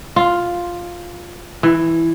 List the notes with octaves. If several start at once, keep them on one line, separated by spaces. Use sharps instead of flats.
F4
E3